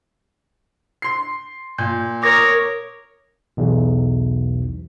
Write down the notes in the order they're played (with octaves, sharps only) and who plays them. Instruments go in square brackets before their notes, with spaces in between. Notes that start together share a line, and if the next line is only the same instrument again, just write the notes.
[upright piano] C6 C7
[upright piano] A#2 [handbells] G6
[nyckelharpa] A#4 C#5 [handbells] D6 D#6 A#6
[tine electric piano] B1 E2